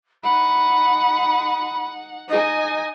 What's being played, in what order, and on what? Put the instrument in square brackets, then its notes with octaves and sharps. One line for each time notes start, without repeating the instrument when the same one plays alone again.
[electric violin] D#4 F#5 [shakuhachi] B5
[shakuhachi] D#4 [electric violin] D#5 G#5